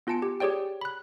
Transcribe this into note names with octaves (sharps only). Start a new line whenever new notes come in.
B3 F4 G#5 A5 C#7 D7
G4
G4 G#4 C#5 D5 G5
B5 F#6